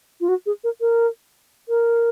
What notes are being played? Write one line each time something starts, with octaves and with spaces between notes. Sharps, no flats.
F4
F#4
G#4
A#4
A#4
A#4